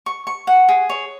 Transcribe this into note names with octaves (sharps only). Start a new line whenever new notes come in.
C#6
C#6
F#5
G#4
C#5